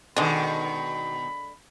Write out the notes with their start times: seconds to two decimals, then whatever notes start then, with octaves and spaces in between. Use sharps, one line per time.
0.16 B2 D3 D#3 G#3 B5